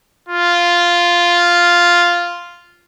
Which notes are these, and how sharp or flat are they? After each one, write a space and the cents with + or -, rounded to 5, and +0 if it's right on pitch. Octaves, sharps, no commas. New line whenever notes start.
F4 -5